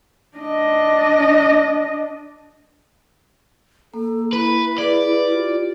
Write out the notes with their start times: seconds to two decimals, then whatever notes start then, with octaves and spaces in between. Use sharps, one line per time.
0.38 D4 D#5
3.94 A#3 A4
4.33 E4 B4
4.78 G#4 B4 D5
5.28 F4 G4